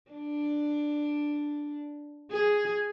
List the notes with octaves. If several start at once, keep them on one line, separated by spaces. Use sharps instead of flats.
D4
G#4